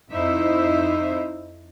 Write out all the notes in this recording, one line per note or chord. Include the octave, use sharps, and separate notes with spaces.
F2 D#4 E4 C5 E5